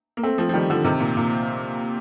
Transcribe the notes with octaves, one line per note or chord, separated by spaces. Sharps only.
A#3
A3 C4
F3 A3
F3
D#3 G3
D3 F3
C3 D#3
A#2
A#2